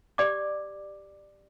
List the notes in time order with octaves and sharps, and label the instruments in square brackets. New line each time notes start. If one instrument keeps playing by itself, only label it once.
[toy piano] G4 D5 D6